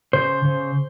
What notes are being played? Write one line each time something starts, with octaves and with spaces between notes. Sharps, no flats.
C#3 C5
C#3